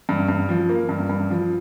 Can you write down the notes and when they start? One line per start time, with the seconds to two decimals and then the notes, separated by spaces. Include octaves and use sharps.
0.09 G2
0.28 G2
0.49 F3
0.69 A#3
0.89 G2
1.09 G2
1.30 F3